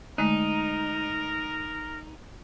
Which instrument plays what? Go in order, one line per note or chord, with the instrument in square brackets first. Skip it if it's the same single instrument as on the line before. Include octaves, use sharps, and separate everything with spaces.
[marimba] D3 G#3 A3 [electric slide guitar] D#4 [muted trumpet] A#4